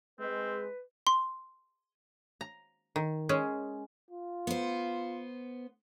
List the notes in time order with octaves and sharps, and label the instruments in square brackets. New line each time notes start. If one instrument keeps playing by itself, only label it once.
[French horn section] G#3 [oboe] C4 [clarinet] B4
[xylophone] C6
[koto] A#5
D#3
G#3 C#4 G#4
[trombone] F4
[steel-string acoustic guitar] B3 C5